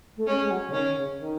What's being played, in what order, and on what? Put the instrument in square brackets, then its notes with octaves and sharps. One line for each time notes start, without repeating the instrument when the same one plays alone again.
[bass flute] A3
[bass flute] G#3 [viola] C#4
[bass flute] G#3
F#3
C#3
[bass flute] D#3 [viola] C#4
[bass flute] C#3
D#3